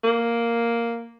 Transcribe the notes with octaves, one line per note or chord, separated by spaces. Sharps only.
A#3